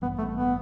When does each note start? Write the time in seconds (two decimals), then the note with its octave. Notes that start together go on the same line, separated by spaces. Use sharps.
0.02 A1 G2 E3 G3 B3
0.18 A3
0.35 B3